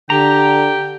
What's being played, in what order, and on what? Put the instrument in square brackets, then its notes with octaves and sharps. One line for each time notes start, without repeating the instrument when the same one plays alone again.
[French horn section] D3 [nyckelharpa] G4 [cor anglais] G5 [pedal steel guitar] A#5